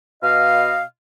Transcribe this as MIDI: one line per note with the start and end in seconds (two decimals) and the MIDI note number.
0.23 0.81 47
0.23 0.81 75
0.23 0.81 77